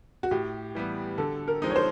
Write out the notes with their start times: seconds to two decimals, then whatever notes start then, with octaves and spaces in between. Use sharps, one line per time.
0.23 F#4
0.31 A2 G4
0.75 E3 G3 B3
1.18 D3 A4
1.48 A#4
1.62 F3 G#3 C4 D#4
1.70 C#5
1.76 C5